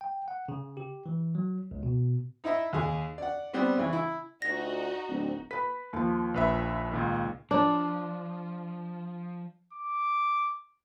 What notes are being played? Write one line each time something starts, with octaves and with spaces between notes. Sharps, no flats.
G5
F#5
C#3
G4
E3
F#3
C#2
B2
D#4 E4 D#5 E5
D#2 G#4
D5 F#5
G3 B3 C4 C5 D5
C#3 E3
E4
D2 D#4 F4 F#4 D5 A#6
D1 C4 D5
B4 B5 B6
D#2 F3
A#1 B4 E5
C#2 A#2 D#3
F3 D4
D6